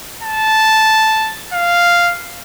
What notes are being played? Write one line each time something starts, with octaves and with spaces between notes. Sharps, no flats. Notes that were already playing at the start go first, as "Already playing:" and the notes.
A5
F5